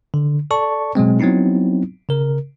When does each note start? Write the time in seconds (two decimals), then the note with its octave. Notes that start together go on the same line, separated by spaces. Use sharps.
0.14 D3
0.51 A4 D5 A5 C#6
0.95 B2 F#3 G#3 C4
1.20 F#3 B3 C4 D#4 E4
2.09 C#3 A#4